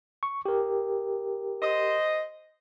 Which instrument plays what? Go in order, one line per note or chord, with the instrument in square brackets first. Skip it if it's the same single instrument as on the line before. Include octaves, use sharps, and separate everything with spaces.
[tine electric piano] C#6
G4 A#4
[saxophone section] C5 D#5